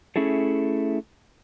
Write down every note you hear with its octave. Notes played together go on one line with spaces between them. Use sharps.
A3 C#4 E4 G#4 A4